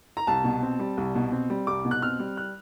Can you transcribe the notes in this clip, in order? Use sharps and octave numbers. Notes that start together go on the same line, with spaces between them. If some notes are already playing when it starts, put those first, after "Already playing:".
A#5
C2 A5
B2
C4
G3
C2
B2
C4
G3
C2 D6
B2
F#6
C4 F6
G3
F#6